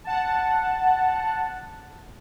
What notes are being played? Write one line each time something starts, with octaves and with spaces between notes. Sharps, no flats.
F#5 A5